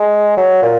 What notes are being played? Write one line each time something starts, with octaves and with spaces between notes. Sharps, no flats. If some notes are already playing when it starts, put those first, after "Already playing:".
Already playing: G#3
F#3
A#2